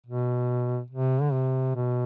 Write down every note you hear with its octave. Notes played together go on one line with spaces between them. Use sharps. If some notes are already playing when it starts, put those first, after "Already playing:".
B2
C3
D3
C3
B2